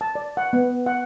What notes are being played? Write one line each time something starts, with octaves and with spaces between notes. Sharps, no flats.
A5
D5
F#5
B3
F#5